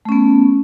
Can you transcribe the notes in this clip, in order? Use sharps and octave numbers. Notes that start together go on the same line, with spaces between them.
A3 B3 C#4